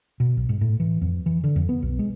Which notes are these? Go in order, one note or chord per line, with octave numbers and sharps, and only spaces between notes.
B2
B1
G#2
A2
E3
F2
E3
D3
F2
B3
B1
G#3